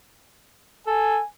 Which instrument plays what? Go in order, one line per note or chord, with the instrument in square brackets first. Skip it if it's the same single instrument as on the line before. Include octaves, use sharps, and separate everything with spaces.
[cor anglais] A4 [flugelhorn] G#5